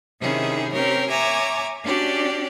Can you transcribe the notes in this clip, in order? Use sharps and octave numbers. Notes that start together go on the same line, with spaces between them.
C3 D#3 C#4 D#4 E4 G#4
C4 C#4 G4 A#4 C#5
C#5 E5 G#5 A#5 D6
C#4 D4 F#4 G4 D5